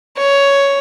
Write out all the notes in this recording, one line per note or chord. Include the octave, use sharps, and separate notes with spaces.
C#5